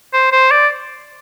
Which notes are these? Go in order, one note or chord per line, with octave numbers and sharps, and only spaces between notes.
C5
C5
D5